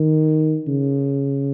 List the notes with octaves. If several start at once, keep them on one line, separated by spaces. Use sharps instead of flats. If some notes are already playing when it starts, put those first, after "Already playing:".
Already playing: D#3
C#3